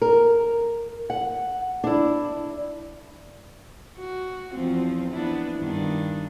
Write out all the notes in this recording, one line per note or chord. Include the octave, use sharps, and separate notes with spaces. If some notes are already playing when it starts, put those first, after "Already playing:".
A#4
F#5
D4 E4
F#4
E2 F3 C4
B3 D4 E4
G2 D#3 D4